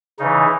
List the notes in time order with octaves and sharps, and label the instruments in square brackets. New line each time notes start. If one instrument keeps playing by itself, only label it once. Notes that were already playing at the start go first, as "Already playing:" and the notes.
[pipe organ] C#3 E3 D#4